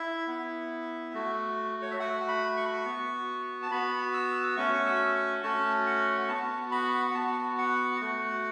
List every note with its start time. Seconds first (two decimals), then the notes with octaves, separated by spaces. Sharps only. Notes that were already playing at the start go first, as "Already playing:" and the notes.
Already playing: E4 E5
0.27 B3 E4
1.13 A3 F#4
1.82 C#5
1.91 E5
1.99 A3 F#4 F#5
2.28 B5
2.57 C#6
2.65 B5
2.73 C#6
2.85 B3 F#4
3.62 A5
3.71 B3 F#4 B5
4.14 E6
4.57 A3 C#4 F#4 C#6
4.74 C#6
4.86 E6
5.15 C#6
5.43 A3 C#4 F#4 A5
5.87 F#5
6.29 B3 F#4 A5
6.72 B5
7.07 F#5
7.15 B3 F#4 A5
7.58 F#5
8.01 A3 F#4